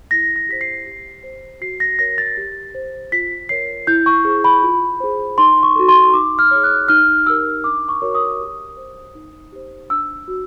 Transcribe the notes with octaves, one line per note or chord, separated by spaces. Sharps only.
E4 A#6
A#6
G4 C5 B6
C7
G4
C5
F#4 C7
A#6
A#4 C#5 A#6
A6
G4
C5
F4 B6
A#4 C#5 C7
E4 G6
C#6
G#4 C5
B5
F4
G#4 C5
D#4 C6
C#6
F#4 A4
C6
D#4 D6
F6
G#4 C#5
F#6
D#4 F6
G4 A#4 E6
D4 D6
C#6
F#4 A#4 C#5
D#6
G4
C5
D#4
G4 C5
D4 E6
F#4